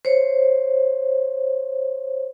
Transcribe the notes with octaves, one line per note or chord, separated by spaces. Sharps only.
C5 C#5